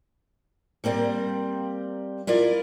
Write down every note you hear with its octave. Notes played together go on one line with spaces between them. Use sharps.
G3 A#3 C4 D5
E4 F4 A#4 D5